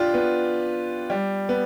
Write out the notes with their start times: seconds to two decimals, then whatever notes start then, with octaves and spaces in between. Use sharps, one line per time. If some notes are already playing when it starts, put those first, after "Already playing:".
Already playing: D4 F4 G4
0.14 B3
1.10 G3
1.49 B3